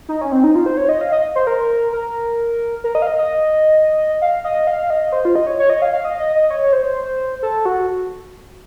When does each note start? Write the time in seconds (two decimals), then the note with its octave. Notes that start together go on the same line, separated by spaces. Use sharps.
0.09 D#4
0.21 C#4
0.32 C4
0.44 D#4
0.55 F4
0.66 C5
0.77 C#5
0.89 D#5
1.01 F5
1.12 D#5
1.35 C5
1.47 A#4
1.93 A#4
2.84 A#4
2.95 D#5
3.02 F5
3.07 D#5
3.19 D#5
4.22 F5
4.45 D#5
4.67 F5
4.90 D#5
5.12 C5
5.25 F4
5.36 D#5
5.47 C#5
5.59 C#5
5.70 D#5
5.82 F5
5.93 F5
6.05 D#5
6.19 D#5
6.35 D#5
6.50 C#5
6.73 C5
7.43 A4
7.65 F#4